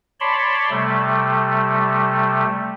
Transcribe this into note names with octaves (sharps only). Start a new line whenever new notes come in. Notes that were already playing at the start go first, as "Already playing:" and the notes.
C#5 D5 A5 B5 C6
C3 G3 A3